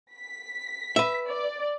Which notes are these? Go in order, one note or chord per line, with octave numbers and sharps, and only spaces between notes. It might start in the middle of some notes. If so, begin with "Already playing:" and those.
B6
B4 E5
D5